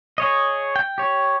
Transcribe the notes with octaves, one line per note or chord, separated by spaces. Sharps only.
G#4 C#5 D#5
G5
G4 C#5